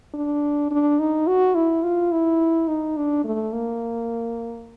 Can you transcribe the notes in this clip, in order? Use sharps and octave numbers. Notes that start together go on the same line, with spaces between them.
D4
D4
D#4
F#4
E4
F4
E4
D#4
D4
A3
A#3